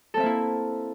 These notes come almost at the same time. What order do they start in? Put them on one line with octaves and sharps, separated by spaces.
A4 C4 E5 A#3 E4